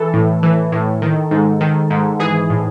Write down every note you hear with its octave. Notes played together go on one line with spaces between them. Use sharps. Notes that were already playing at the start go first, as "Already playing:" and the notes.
Already playing: E3 A4
A2
E3
A2
D#3
G#2
D#3
G#2
E3 G#4
A2